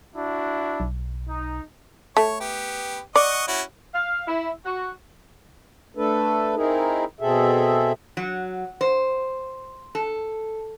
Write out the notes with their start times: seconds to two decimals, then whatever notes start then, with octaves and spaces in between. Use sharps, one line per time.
0.15 D4 E4 F#4
0.80 B1
1.29 D#4
2.17 A3 C#5
2.41 B3 G4
3.16 D5 D#5 F#5 C#6
3.48 C#4 E4 F#4
3.94 F5
4.27 E4
4.65 F#4
5.97 A3 D4 A4 B4
6.56 C4 D#4 E4 G#4 A#4
7.20 B2 C4 G#4 A4 E5
8.17 F#3
8.81 C5
9.95 A4